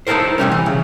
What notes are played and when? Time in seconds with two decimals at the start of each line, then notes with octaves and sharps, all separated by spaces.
0.07 D#4 E4 G4 A4 A#4 C5
0.38 C3 G3 A3 C#4
0.52 E3
0.66 C#3